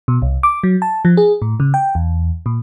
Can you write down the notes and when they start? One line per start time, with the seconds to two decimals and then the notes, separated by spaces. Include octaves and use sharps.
0.08 B2
0.22 C2
0.43 D6
0.63 F#3
0.82 A5
1.05 F3
1.17 G#4
1.42 A2
1.60 C#3
1.74 G5
1.95 E2
2.46 A#2